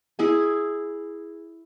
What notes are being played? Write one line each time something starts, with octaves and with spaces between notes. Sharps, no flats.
E4 G#4 G#5